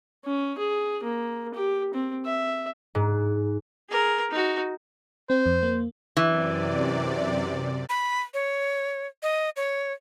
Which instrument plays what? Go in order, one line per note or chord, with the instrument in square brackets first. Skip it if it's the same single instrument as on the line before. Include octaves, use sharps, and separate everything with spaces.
[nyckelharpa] C#4
G#4
A#3
G4
C4
E5
[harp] G#2
[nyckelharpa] G#4 A#4
D#4 F#4
[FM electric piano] C4 [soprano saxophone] C5
[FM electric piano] F2
A#3
[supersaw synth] F#2 C3 D5 [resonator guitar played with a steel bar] E3
[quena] B5
C#5
D#5
C#5